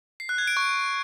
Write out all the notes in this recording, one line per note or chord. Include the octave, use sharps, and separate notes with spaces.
C7
F#6
G#6
D7
C#6